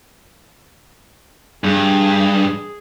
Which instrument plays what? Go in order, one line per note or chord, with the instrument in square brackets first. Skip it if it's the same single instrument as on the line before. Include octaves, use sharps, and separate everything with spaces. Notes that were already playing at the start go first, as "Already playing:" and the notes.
[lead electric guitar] G2 [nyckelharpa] G#4